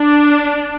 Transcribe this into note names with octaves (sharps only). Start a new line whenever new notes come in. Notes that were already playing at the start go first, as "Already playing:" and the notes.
Already playing: D4